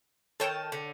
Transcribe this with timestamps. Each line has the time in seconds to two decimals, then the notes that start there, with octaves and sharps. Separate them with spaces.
0.40 D#3 A4 C#5 G5 A5
0.72 D3